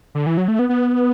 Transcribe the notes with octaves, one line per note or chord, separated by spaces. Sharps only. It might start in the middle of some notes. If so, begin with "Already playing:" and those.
D3
E3
F#3
A3
B3
B3